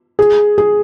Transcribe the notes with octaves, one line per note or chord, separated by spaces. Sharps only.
G#4
G#4